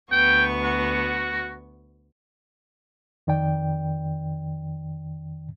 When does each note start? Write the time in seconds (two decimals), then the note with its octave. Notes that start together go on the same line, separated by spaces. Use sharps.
0.12 D2 B3 G5 C#6
0.63 F#4
3.27 F2 D#3 D5 G5